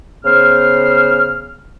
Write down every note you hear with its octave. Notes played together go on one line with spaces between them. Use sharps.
C#3 B3 C5 F6